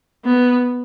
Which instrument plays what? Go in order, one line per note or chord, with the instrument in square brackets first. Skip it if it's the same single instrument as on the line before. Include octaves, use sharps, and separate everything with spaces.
[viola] B3